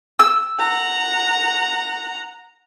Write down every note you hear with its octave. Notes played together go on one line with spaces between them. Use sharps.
E6
F#5 A#5